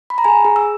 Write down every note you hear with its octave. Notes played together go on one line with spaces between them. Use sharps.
B5
A#5
G#4 G#5
G#4
E6